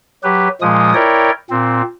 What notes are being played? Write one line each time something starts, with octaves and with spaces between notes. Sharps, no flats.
F#3 G4 B4
A#2 F3 G#3 D#6
E4 A#4 C#5 D5 G5
A#2 C4